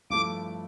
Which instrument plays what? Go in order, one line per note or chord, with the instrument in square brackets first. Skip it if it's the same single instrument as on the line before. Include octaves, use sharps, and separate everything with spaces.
[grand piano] G2 F3 A3 E4 A4 [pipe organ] D6